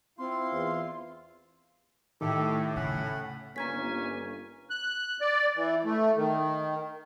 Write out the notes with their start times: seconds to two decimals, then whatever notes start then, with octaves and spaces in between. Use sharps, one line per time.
0.18 C4 E4 F4 F5 C6
0.52 E2
2.21 A2 D#3 A3 G4 A4
2.76 C#3 C#4 F#5 B5
3.56 G1 A#3 C#4 G#5 A#5 G#6 B6
4.70 F#6
5.21 D5
5.56 E3
5.85 A3
6.17 D#3